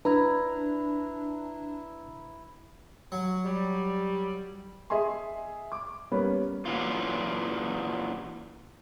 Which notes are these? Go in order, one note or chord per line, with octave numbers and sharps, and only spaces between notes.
D4 E4 B4 A#5
F#3
G3
G#4 D#5 E5 G#5 C6
D6
G3 A#3 B3 C#4
A#2 E3 F#3 F4